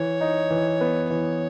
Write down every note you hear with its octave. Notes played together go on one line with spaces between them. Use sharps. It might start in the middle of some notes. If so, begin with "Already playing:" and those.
Already playing: E3 C#5
D#4
E3
B3
E3 C#5